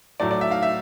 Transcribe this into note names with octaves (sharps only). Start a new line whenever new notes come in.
A2 F#3 A3 D5
D5
E5
F5
E5